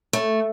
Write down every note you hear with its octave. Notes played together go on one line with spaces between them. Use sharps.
A3